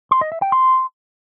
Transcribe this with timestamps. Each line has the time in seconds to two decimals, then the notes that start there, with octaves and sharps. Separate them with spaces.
0.11 C6
0.21 D#5
0.32 E5
0.42 G5
0.52 C6